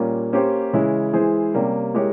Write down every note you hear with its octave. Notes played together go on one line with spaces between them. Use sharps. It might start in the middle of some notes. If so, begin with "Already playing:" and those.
Already playing: A#2 G3 A#3 C#4 F4
A#3 C#4 G4 C5
C#3 E3 G#3 C#4 E4
E3 G#3 E4 G#4 C5
C3 G3 A#3 C#4
G#3 E4 G4 A#4 C#5